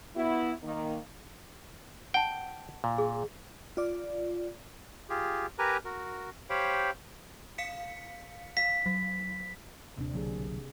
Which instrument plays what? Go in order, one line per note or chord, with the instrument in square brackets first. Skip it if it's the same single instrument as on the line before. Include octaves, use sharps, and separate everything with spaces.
[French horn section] B3 E4 F#4
D#3 A#3
[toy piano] F#5 A5 [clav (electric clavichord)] G5
[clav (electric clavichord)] A#2
[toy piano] G#4
[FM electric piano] F4 D5
[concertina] F4 G4 G#4
G4 A#4 B4 G#5 A#5
F#4 A#4
G4 C5 C#5 F5 G5 B5
[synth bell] F5 B6 C#7
[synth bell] F5 [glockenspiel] B6
[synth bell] F#3
[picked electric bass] D#1 [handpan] C3 C4 D4
[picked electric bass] B1 D3 F#3 [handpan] A#3 G#4